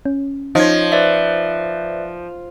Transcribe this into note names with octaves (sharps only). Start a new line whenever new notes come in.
C#4
F3 D#4 C#5 D#5
B4 D5 E5